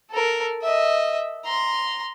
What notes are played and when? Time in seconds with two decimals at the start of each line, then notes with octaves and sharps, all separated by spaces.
0.11 A4 A#4
0.63 D#5 E5
1.45 A#5 C6